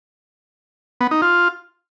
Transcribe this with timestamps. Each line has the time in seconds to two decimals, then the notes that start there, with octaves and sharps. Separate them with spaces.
1.01 B3
1.11 D#4
1.22 F4